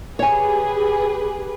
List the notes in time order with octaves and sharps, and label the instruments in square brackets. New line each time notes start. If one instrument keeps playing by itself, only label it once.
[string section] G4 G#4 B4 [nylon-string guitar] C#5 G#5